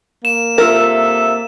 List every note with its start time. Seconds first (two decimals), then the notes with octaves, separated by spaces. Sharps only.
0.25 A#3 E7
0.58 C3 F4 A4 A#4 E5